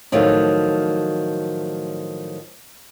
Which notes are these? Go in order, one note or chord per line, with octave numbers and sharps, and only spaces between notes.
A2 D#3 F3 F#3 A3